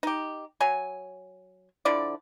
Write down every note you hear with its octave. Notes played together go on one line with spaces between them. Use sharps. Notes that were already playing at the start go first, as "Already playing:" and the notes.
D#4 G4
F#3 C#5 G#5
D3 F3 E4 D5